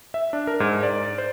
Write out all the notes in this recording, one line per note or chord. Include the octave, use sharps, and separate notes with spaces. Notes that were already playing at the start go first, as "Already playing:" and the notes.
E5
D4
A#4
G#2
D5
C5